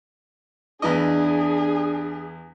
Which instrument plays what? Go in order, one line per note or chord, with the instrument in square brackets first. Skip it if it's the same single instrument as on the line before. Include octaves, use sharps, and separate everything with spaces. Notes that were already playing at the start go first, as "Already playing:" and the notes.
[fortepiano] E2 E3 D#5 [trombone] D4 [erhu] G#4